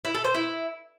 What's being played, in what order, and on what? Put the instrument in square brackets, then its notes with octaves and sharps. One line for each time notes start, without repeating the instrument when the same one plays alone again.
[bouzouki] E4
A4
C5
E4